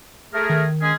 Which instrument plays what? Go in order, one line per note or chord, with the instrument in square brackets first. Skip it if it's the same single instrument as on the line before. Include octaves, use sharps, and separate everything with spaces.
[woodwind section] A3 G#4 A#4
[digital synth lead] D#3
[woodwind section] G#3 C#4 G#4